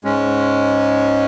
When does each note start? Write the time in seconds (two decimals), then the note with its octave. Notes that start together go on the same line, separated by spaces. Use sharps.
0.04 G#2 G#3 C#4